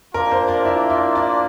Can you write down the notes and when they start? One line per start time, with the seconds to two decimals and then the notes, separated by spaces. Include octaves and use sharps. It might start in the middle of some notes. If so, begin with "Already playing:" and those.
0.14 A#3 D4 F4 A#4
0.31 C5
0.48 D5
0.65 E4
0.90 E4
1.15 D5